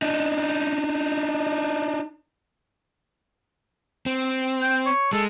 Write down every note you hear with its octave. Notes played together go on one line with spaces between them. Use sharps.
D4 D#4
C4
G5
C#5
G#3 A4